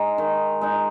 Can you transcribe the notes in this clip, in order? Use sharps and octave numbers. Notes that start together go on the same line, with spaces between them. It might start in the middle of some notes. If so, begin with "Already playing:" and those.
Already playing: G#3 D#4
D#3
G#3 D#4